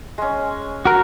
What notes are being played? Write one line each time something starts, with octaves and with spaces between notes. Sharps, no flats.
G#3 C#4
F#4 A#4